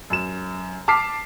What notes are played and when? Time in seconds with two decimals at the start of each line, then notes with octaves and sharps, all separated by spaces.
0.10 F#2 E7
0.88 A5 D6 F6 B6 C7